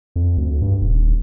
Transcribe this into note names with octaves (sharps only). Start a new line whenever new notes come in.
F2
D2
G2
D#1